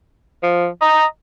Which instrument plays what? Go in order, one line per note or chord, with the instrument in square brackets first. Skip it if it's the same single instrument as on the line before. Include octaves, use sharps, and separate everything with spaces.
[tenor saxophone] F3
[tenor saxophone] D#5 [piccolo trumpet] A#5